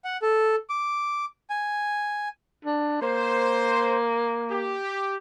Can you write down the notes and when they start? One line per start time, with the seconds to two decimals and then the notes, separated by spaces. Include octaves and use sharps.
0.04 F#5
0.22 A4
0.70 D6
1.50 G#5
2.65 D4
3.02 A#3 C5
4.51 G4